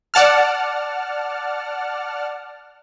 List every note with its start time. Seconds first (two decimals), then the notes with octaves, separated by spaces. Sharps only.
0.14 D5 F#5 A5 F6